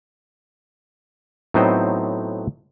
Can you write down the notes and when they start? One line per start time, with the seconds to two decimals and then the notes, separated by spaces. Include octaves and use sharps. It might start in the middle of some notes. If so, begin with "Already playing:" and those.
1.54 A2 F#3 B3 C4 D#4 C5